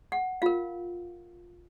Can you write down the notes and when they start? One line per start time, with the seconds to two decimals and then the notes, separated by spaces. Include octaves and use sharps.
0.12 F#5
0.42 F4 A#4 F5